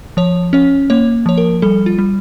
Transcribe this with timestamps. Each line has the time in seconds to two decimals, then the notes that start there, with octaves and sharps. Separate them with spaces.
0.17 F3 C#5
0.53 C#4 C#5
0.90 A#3 C#5
1.26 F3 C#5
1.38 A#4
1.62 G3 A4
1.86 F4
1.99 G3